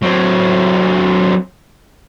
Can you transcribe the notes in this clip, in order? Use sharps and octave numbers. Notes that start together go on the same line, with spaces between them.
F#3 C4